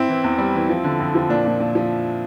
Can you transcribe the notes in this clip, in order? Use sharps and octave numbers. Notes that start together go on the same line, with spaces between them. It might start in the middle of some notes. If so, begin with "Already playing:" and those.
Already playing: C4 E4
E3
E2
G3
E3
F3
D3
F2
F3
A#2 D4
A#2
A#2
F3